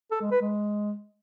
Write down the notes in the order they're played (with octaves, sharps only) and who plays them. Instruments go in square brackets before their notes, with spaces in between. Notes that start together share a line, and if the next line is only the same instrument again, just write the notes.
[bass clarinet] A4
G#3
B4
G#3